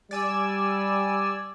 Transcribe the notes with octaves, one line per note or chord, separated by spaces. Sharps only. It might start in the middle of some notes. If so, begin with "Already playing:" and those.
G3 D5 G#5 E6